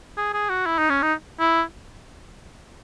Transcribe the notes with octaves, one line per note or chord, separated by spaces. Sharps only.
G#4
G#4
F#4
E4
D#4
C#4
D#4
E4